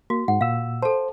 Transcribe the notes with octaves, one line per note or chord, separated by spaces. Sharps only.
A#3 F#4
G#2 F#5
A#2 F5 E6
A4 C5 A5